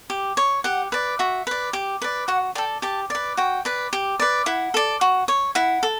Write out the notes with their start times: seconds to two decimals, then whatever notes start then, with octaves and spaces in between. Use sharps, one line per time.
0.10 G4
0.37 C#5
0.64 G4 F#5
0.92 B4 D5
1.19 F#4 E5
1.47 B4 D5
1.73 G4
2.02 B4 D5
2.28 F#4 F#5
2.55 A4 D5 G5
2.82 G4 A5
3.10 B4 D5
3.37 F#4 G5
3.65 B4 D5
3.93 G4
4.19 B4 D5
4.46 E4 F#5
4.74 A4 D5
5.01 F#4
5.28 C#5
5.55 E4 F#5
5.83 A4